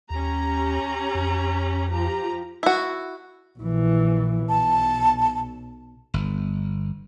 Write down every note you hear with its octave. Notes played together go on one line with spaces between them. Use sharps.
D#2 C#4 G4 A#5
F2
F3 G4 A#5
E4 F#4
A#1 E3
B1 A5
G1